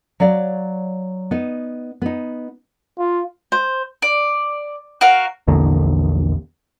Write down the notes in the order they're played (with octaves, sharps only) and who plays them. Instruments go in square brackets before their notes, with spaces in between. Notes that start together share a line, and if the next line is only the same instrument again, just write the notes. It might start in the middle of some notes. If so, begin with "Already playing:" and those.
[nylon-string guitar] F#3 C#5 D5 F5
B3 D#4
B3 D#4
[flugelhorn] F4
[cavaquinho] C5
[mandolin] D5
F#4 A#4 C#5 F5
[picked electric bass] A#1 E2 D3 A#3